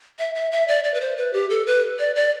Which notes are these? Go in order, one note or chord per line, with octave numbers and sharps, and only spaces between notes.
E5
E5
E5
D5
D5
B4
C5
B4
G4
A4
B4
D5
D5